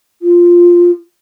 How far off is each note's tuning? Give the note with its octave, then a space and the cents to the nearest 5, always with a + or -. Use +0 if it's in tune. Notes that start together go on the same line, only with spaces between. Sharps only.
F4 +0